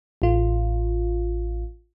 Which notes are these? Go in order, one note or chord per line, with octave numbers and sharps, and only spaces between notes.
A1 F4